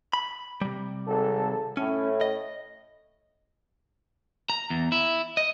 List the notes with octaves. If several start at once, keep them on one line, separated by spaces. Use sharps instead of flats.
B5
C3 G3
G#1 A4
A2 C#4
D#5
A#5
E2
E4
D#5